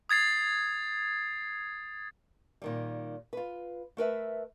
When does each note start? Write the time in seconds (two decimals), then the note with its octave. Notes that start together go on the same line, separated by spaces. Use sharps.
0.09 D#6 G#6 A6 C7
2.62 A#2 D#3 G3
3.33 F4 B4
3.97 A3 A#4 B4 E5